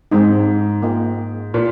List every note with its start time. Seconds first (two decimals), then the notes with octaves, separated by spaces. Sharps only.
0.11 G#2 G#3 C4 D#4
0.82 A#3 F4 G#4 D#5 G5
1.54 A#2 F4 A#4 F5